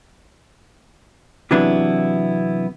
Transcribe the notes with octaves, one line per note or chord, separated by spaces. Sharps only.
C3 E3 F#3 B3 D4 E4